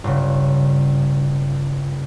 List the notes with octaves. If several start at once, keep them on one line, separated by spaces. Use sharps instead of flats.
G1 C#3